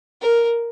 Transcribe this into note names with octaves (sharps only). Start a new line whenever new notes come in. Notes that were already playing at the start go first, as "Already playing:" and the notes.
A#4